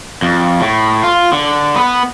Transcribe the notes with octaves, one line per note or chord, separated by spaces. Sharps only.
F2
A2
F4
D3
B3 B4